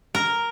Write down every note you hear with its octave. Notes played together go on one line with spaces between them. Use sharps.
A#4